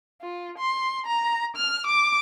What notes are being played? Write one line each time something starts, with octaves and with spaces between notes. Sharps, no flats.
F4
C6
A#5
F6
D6